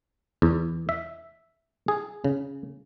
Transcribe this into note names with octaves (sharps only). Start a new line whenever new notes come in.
E2
E5
G#4
C#3